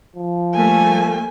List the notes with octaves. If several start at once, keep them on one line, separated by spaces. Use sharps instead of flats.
F3
G3 A3 A#3 G#5